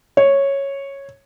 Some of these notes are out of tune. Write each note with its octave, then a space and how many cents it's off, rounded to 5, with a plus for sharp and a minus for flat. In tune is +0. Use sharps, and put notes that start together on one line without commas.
C#5 -5